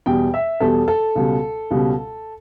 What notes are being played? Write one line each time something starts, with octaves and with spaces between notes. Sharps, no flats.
E2 B2 G3 G5
E5
E2 B2 G3 A4
A4
C#2 B2 G3
C#2 B2 G3